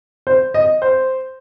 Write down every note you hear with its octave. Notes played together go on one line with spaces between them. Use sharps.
C5
D#5
C5